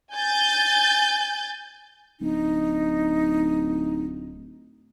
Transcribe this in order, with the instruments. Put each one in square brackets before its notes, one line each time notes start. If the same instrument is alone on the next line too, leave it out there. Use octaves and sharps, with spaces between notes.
[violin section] G#5 G6 A6
[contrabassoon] D1 [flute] D#4